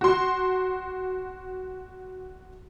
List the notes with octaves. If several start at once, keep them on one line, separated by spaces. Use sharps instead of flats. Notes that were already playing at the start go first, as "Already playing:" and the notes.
F#4 C6